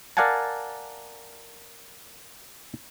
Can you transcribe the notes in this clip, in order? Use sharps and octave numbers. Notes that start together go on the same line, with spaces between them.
A#4 D5 F5 F#5 G#5 A5